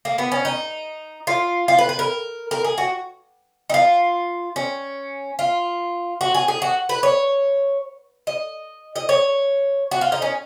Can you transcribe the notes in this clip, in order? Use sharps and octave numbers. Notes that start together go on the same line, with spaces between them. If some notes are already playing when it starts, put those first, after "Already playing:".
A#3
B3
C#4
D#4
F4
F4
B4
B4
A#4
A#4
G#4
F#4
D#4
F4
C#4
F4
F#4
G#4
G#4
F#4
B4
C#5
D#5
D#5
C#5
F#4
F4
D#4
C#4